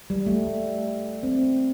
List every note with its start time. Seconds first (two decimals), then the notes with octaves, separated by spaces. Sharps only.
0.10 G3
0.27 A3
1.23 C4